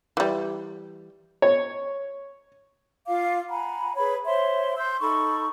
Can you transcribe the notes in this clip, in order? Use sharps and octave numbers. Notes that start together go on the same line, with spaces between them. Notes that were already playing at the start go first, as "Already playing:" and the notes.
E3 G3
C#5
F4 F5 D6
F#5 G#5 A#5 B5
G#4 B4 C#5 B5
C5 C#5 E5 C6
C6 E6 G6
D#4 A4 B5 C#6